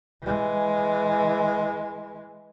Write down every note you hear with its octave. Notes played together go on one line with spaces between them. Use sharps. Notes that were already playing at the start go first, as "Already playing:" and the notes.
E3 G#3